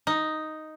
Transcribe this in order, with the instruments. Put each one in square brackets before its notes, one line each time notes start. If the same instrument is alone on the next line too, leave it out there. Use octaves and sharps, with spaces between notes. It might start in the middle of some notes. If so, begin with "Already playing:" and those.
[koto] D#4